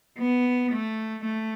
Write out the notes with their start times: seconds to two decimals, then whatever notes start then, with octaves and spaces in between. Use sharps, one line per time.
0.19 B3
0.72 A3
1.25 A3